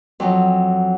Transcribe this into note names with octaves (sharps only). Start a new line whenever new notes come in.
F2 F#3